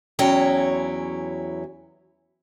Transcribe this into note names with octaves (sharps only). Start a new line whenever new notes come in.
E2 F#3 C#4 E4 G5